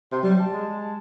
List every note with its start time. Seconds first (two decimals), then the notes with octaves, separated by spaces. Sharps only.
0.11 C3 C6
0.23 F#3 G3
0.40 A5
0.53 G#3